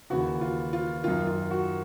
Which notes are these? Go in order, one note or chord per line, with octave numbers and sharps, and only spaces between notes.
D#2 C#3 E3 F#4
F4
F4
F#2 D#3 F4
F4
F#4